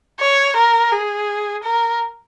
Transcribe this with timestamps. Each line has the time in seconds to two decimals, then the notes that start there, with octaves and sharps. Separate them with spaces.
0.20 C#5
0.56 A#4
0.92 G#4
1.63 A#4